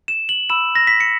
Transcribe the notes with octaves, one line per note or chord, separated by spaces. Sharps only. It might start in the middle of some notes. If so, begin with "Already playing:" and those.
E7
F#7
B5 E6 E7
A#6
B6
C#7